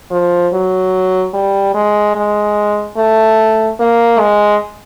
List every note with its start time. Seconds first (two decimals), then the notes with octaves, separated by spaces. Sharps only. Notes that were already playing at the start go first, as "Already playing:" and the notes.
0.11 F3
0.53 F#3
1.34 G3
1.75 G#3
2.16 G#3
2.97 A3
3.80 A#3
4.19 G#3